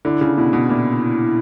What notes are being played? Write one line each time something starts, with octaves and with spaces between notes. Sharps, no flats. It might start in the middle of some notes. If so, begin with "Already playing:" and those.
D3 E4
C#3
B2 E4
B2
A#2 E4